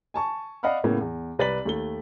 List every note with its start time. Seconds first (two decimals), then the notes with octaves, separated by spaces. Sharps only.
0.14 G#5 A5 C#6
0.63 D5 D#5 F5 F#5 B5 F6
0.84 A2 C#3 A#3 B3
1.01 E2
1.39 C2 B4 D5 A6 B6 F#7
1.65 D#2 A3 G7